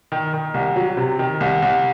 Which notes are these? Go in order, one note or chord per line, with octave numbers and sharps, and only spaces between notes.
D#3
D#3
C2
F#3
C3
D#3
C2
C2